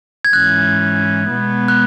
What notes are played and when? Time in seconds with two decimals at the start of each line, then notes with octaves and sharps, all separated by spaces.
0.25 G#6
0.33 G#2 E3 C#4 E4 F#6
1.31 B2 G#3 B3
1.68 F#6